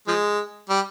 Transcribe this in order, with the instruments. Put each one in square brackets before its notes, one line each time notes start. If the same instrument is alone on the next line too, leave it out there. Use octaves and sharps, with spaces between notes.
[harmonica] F3 G#3
G3